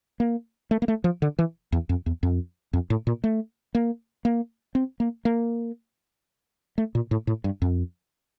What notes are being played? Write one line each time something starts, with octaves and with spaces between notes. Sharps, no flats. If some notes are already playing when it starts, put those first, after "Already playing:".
A#3
A3
A#3
A3
F3
D3
E3
E2
F2
E2
F2
F2
A2
A#2
A3
A#3
A#3
C4
A#3
A#3
A3
A#2
A2
A2
G2
F2